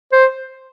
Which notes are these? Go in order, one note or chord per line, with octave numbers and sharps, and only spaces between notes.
C5